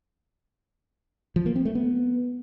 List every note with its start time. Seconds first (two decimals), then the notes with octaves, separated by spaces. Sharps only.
1.36 F3
1.46 A#3
1.56 C4
1.65 A3
1.75 B3